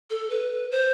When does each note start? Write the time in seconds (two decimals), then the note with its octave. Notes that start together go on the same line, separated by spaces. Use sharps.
0.10 A4
0.30 B4
0.71 C5